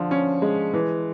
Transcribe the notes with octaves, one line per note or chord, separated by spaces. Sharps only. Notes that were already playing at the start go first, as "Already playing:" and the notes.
Already playing: D3 F3
C#4
G#3
E3